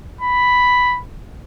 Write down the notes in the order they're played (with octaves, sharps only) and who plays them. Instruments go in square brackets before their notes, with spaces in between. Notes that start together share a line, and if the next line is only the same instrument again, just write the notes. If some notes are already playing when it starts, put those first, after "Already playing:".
[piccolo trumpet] B5